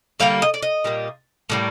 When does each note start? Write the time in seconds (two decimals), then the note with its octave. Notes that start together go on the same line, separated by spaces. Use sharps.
0.20 D3 G3 A#3 F5
0.42 D#5
0.54 D5
0.63 D#5
0.84 A#2 G3 A#3
1.50 A2 G3 A#3